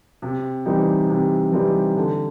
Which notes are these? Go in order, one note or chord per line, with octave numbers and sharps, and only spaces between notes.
C3
E3 G3 C4 D#4
C3
E3 G3 C4 D#4
D3